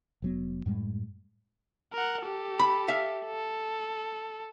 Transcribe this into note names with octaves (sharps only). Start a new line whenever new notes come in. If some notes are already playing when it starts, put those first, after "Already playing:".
F1 F#3 B3
F#2 A2 G3 G#3
A#4 F#5
G4 A4
B5
E5 F5
A4